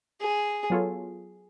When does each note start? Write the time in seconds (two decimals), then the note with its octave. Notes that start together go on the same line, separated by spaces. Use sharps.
0.21 G#4
0.70 F#3 B3 F4 A4 C#5